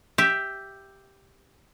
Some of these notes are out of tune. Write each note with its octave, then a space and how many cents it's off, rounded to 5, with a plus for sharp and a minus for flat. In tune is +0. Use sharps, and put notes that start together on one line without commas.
G4 +0 E5 +0